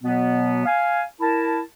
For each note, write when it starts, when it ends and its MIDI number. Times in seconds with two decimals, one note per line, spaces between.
0.03 0.64 47
0.03 0.64 54
0.03 0.64 59
0.66 1.02 77
0.66 1.02 80
1.20 1.60 64
1.20 1.60 70
1.20 1.60 81